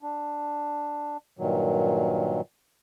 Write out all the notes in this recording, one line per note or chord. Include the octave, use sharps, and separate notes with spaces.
D4
G2 A#2 D#3 F#3